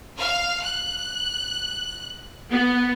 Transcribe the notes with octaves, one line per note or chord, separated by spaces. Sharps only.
F5
F#6
B3